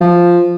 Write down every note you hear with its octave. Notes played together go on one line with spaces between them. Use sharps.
F3